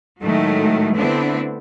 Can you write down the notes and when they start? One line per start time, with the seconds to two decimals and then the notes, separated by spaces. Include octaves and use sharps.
0.21 A2 D#3 F#3 G#3 A3
0.94 D3 A3 B3 C4 D4 E4